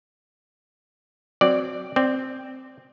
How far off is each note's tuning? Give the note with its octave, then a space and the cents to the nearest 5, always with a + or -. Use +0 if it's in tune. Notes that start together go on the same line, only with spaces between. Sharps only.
F#3 +0 C4 +0 D5 +0
C4 +0 D5 +0